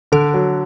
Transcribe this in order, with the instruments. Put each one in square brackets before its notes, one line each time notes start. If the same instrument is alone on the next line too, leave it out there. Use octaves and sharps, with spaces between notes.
[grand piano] D3 [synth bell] A4
[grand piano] F#3